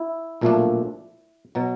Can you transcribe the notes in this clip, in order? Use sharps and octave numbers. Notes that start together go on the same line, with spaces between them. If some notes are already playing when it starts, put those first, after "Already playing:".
Already playing: E4
B1 A#2 F3 A3 D4
B2 F#3